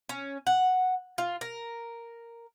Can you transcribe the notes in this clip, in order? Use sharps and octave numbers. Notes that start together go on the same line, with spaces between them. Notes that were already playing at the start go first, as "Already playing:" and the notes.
C#4
F#5
F4
A#4